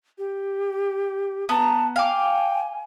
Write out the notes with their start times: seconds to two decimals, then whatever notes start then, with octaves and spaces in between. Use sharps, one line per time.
0.18 G4
1.49 B3 A5 A#5
1.96 F5 G5 G#5 D6